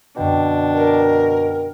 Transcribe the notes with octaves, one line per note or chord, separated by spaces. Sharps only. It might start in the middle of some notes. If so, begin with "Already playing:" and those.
F#2 B2 D3 D4 G5
A#4